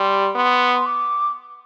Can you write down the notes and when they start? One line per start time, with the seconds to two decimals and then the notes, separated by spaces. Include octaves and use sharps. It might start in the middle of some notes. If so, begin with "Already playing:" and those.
Already playing: G3 C6
0.35 B3 C6
0.74 C6
0.86 D6